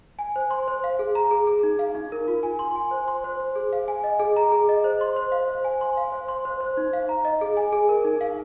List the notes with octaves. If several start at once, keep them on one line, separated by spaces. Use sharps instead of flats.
G#5
C5
C6
C5
F5
G#4
A#5
G#4
G#4
D#4
F5
D#4
A#4
F4
G#5
C6
G#5
C5
C6
C5
C5
G#4
F5
G#5
D#5
G#4
A#5
G#4
D#5
C5
C6
C5
F5
C5
G#5
C6
F5
C5
C6
C5
C5
D#4
F5
A#5
D#5
G#4
G#5
G#4
A#4
D#4
F5